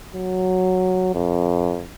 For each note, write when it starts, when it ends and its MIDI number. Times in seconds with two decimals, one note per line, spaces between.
0.14 1.14 54
1.14 1.84 41